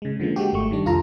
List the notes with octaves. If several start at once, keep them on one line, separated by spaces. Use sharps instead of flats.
C#3 G#3
D3 F3 G#3 A#3
G#3 F#4 G4
G1 A3 C#6
D#3 G3 D4
C2 F2 F4 A4 A#5